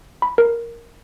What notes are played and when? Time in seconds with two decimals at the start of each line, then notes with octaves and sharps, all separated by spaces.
0.22 B5
0.38 A#4